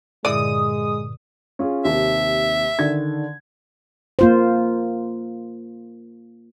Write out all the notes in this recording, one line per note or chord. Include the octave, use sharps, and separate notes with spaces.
G2 A#2 D3 G#3 E4 D5 D#6
C#4 F4 G#4
D#2 C3 E5
D3 D#3 G#6
A#3 F4 C5